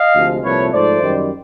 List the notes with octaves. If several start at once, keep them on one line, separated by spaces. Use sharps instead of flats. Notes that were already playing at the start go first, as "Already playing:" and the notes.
Already playing: D#5 F5
D2 C3 F3 G#3
C2 A#2 F3 A3 B4 C#5
G#2 F3 A3 C5 D5
F#2 D#3 G3